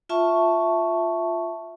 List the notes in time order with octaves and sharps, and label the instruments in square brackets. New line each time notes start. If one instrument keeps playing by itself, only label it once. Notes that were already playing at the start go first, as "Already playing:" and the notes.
[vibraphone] F4 E5 A5 C#6